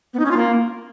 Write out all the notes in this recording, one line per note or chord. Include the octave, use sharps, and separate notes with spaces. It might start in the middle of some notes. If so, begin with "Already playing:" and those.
B3
D#4
C#4
F4
A#3